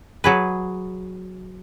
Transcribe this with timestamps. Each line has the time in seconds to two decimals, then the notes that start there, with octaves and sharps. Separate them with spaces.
0.24 F#3 G#4 B4